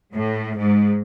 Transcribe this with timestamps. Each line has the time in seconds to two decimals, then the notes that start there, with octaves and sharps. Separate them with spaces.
0.14 A2
0.58 G#2